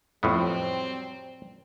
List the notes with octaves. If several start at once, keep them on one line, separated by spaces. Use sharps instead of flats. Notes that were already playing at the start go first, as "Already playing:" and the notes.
F2 A2 F#3 G3 B3 C4